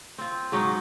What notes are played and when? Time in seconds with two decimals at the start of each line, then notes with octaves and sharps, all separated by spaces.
0.18 C4 F4
0.52 G#2 F#3 C#4 D#4